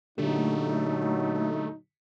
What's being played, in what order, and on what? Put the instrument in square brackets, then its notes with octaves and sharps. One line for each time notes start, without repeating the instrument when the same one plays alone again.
[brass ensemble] A#2 F#3 [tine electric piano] D3 D4 G4 [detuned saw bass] A3 [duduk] D#4